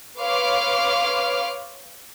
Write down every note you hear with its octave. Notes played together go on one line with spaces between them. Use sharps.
B4 C#5 F5 C6 D6 F6